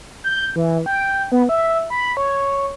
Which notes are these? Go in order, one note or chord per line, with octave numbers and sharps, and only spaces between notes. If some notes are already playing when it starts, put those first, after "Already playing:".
G6
E3
G5
B3
E5
B5
C#5